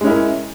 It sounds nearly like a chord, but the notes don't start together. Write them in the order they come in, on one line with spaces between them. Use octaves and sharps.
G#3 C#4 E4 A#4